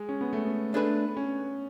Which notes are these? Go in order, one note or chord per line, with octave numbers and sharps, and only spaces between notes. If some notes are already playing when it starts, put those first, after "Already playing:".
Already playing: G#3
C#4
B3
A3
B3
A3 D4 G#4 B4
C#4